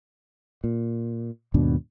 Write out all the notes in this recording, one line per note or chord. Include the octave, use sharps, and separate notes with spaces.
A#2
D#2 G#2 B2 D4